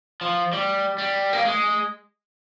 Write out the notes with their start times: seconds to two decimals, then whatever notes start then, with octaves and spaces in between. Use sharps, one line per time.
0.21 F3
0.53 G3
0.98 G3
1.33 A#3
1.45 G#3